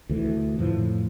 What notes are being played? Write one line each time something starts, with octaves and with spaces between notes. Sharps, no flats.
D2 E3
F2 A2 E3 F3